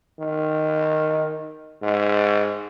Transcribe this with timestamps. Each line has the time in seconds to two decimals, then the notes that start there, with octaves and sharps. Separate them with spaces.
0.19 D#3
1.82 G#2